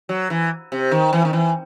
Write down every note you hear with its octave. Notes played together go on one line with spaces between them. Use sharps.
F#3
E3
C3
D#3
E3
D#3
E3